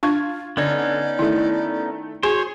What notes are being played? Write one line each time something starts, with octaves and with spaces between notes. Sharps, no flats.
D4 F4 C#6 G#6
D3 B3 C#4 D#4 D5 G#6
D#3 A3 E4
F#4 G#4 C5 C#5